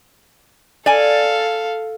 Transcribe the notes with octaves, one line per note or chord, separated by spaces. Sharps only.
A4 D5 F5 G#5